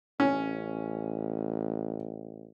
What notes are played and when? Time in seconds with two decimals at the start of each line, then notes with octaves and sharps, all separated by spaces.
0.20 A1 C#4